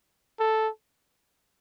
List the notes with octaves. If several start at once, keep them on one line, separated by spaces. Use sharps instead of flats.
A4